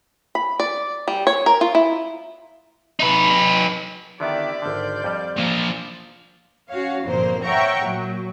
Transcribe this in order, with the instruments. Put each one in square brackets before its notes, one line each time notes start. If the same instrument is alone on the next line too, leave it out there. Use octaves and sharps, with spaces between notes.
[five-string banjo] B5
D5
G3
C#5
A#4
F4
E4
[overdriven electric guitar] D#4 B4
[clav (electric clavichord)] D3 D#3 B3 [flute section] E4 G4 E5 [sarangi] D5
[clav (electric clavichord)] G#1 D3 [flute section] C6 F6 G6
[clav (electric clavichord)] F2 G3
[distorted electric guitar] A#2 F3
[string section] C#4 F#4 C#5 F5
G1 F2 A#2 A#3 C5
C#5 E5 F#5 G5 A#5 C#6
A#2 F#3